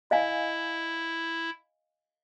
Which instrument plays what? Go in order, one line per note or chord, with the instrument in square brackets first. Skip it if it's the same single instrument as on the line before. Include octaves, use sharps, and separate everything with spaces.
[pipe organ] E4 [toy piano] D#5 F5 G#5